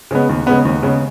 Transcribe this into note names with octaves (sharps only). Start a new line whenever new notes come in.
C#3 G#3 B3
D#2
C#3 G#3 B3
D#2
C#3 G#3 B3